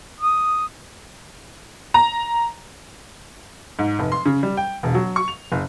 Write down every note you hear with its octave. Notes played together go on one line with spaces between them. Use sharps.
D#6
A#5
G#2
F1
C6
C#3
G3
G5
E1
F#3
C#6
F7
F#1